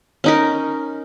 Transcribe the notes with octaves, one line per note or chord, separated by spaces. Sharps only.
C#4 D#4 A#4